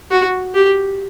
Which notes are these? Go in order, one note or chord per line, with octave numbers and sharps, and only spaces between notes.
F#4
G4